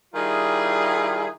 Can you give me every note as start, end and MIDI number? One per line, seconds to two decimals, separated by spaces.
0.14 1.28 51
0.14 1.28 55
0.14 1.28 64
0.14 1.28 65
0.14 1.28 68